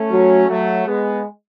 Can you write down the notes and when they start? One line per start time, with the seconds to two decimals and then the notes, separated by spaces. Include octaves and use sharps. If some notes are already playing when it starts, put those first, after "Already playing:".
Already playing: A3 C#4
0.11 F#3
0.49 F#3 A3
0.86 G#3 B3